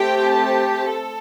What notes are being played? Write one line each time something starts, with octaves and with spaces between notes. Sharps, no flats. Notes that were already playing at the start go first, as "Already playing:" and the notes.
Already playing: A3 C4 G4 G5
A5
A4